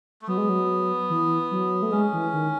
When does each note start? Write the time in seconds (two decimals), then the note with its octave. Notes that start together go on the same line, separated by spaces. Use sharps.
0.22 A3
0.27 F#3 B3
0.38 G#3
0.49 F#3
1.10 E3
1.51 F#3
1.82 A3
1.91 G#3 C#4
2.13 E3
2.33 D#3